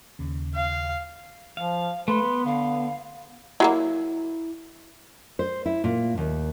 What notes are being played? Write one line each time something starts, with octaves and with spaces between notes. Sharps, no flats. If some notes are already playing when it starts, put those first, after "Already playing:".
D#2 C#3
F5
F3 F5
A3 B4 C6
B3
D3 F5
F#3 G#3 A#3 E4
C5
E4
A#2
D#2